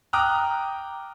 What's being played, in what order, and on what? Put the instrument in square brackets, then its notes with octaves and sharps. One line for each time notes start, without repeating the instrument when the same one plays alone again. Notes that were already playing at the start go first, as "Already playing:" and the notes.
[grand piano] G5 A#5 D6 D#6 F6 F#6